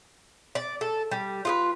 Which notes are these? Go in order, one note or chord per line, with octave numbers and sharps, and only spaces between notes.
D5
A4
G3
F4 G#4 B4